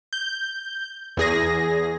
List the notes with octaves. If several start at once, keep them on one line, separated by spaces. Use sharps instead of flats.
G6
E2 G#4 A#6